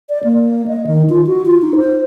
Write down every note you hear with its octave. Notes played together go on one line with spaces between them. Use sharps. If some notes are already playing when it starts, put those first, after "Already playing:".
D5
A#3
D#5
D#3
F4
F#4
F4
D#4
C5